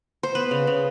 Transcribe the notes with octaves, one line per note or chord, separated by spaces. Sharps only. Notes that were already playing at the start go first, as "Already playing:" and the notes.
C5
B3 B4
C#3
C#3